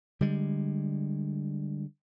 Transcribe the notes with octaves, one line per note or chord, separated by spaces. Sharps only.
D3 G3 G#3